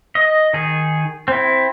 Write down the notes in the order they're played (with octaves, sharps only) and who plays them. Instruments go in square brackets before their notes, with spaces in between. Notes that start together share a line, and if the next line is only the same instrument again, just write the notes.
[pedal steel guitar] D#5
D#3 G#4
C4 E4